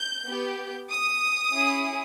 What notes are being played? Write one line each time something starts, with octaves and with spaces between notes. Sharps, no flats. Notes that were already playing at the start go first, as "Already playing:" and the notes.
Already playing: G6
B3 G4
D#6
C#4 E4 G#4